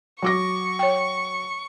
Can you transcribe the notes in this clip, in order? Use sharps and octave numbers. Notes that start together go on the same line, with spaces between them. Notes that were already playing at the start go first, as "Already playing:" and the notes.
F#3 C#6 D6 A#6
C#5 G5